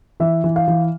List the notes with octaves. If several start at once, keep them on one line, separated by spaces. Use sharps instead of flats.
E3 E5
E3
F5
E3